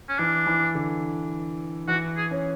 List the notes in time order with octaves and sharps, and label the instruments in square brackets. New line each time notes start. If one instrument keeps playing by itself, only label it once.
[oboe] C#4
[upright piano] E3 [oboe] D4
[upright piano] E3
D3
[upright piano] E3 [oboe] F#4
[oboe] G#4
[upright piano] C#4